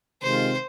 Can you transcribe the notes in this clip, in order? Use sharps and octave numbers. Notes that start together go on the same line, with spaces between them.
C3 D#3 G#3 C4 F4 C5